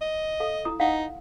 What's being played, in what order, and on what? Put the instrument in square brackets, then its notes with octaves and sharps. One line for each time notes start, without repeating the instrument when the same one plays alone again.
[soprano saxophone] D#5
[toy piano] A4 F5
E4 A#5 D#6
[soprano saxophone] D#4 [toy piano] F5 F#5